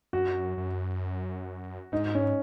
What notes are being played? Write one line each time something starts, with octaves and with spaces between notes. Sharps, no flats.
F#2 F#4
F#2
G#2 D#4
C#4